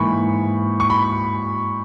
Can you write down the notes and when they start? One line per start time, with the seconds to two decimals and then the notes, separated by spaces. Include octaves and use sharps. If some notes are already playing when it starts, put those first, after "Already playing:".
Already playing: G#2 E3 A#3 B5 C#6
0.80 C#6
0.90 B5